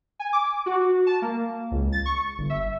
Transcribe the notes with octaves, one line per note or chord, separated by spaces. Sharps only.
G#5
D6
F#4
A5
A#3
C#2
A6
C#6
G1
E5